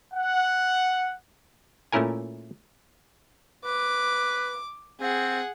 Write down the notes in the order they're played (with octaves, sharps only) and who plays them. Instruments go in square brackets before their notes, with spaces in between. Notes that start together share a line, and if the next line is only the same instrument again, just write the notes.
[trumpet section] F#5
[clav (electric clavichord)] A#2 A3 C#4 E4 A#4 G#5
[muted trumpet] B4 [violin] D6
[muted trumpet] C4 [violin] G#4 F#5